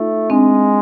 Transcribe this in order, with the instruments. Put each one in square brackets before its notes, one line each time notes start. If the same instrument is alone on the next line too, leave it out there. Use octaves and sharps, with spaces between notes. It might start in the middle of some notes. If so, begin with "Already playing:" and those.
Already playing: [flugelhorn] A3 [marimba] D#4 F4
[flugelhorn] G#3 [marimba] C4 D4